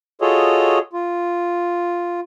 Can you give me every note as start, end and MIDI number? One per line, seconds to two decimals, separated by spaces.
0.21 0.79 65
0.21 0.79 66
0.21 0.79 68
0.21 0.79 69
0.21 0.79 73
0.21 0.79 75
0.93 2.20 65